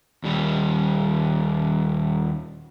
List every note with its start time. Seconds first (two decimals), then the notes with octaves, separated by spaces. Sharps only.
0.24 D#2 G3